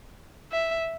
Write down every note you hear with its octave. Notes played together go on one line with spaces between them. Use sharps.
E5